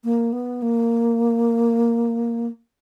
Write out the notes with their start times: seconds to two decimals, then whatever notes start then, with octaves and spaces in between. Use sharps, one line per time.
0.04 A#3
0.33 B3
0.62 A#3